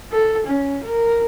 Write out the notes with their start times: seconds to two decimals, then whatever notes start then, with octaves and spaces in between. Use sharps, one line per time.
0.12 A4
0.46 C#4
0.84 A#4